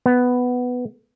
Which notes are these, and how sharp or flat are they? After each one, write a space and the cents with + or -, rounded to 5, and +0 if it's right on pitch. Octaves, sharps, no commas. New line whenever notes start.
B3 +5